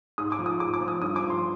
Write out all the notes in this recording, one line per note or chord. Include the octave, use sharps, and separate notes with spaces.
G#2 D#6
D6
F3
D#6
G#2 D6
D6
F3
D#6
G2 D#6
D6
F3
C6